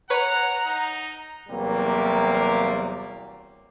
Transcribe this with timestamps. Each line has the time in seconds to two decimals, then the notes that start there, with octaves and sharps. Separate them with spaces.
0.10 B4 C#5 F#5 A#5
0.67 D#4
1.49 E2 C3 F#3 G3 A#3